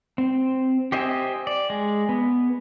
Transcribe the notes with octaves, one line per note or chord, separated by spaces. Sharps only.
C4
G4 C5 D#5 E5 G#5
D5
G#3
B3